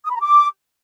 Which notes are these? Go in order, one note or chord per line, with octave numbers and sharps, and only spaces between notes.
D#6
B5
A#5
D6